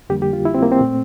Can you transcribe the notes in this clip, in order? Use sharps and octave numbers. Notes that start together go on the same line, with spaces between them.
F2 D3 G3 A#3 G4
G4
F4
E4
C4
A#3
C4
A#2 A3